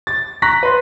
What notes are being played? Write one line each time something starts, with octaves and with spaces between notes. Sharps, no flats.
A6
A#5 C#6 F#6 A#6 B6
B4 C6